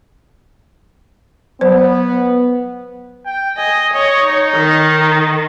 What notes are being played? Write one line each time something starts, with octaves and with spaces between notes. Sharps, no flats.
F#3 B3 C5
G5
D#5 G#5
C#5 D#5
D#4
D#3